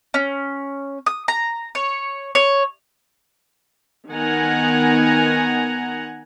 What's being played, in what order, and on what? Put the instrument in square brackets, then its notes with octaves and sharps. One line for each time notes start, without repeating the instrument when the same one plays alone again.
[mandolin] C#4
D#6
A#5
C#5
C#5
[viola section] D#3 B3 F#5 G#5 A#5